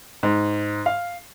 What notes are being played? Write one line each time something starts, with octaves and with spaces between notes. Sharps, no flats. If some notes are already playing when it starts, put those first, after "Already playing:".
G#2
F5